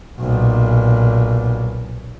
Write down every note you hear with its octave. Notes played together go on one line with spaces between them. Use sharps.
B1 A#2